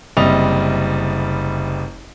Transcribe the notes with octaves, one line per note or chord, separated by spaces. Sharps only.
F#1 C3 G3 D#5 F7